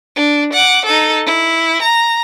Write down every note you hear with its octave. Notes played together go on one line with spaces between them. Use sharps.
D4
F#5 D6
D#4 A4
E4
A#5